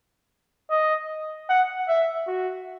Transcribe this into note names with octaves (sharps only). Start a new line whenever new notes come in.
D#5
F#5
E5
F#4